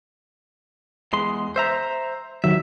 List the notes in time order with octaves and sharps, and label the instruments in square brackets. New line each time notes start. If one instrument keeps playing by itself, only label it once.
[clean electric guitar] E2 G#3 C6
C5 E5 A#5
[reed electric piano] D#3 F#3 [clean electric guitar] E5